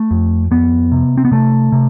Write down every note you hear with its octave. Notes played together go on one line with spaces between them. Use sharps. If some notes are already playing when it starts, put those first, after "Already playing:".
Already playing: A3
F2
F2 B3
C3
C4
B3
C3 A3
C3